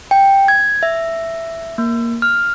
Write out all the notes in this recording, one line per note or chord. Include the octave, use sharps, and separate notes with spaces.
G5
G#6
E5
A#3
F6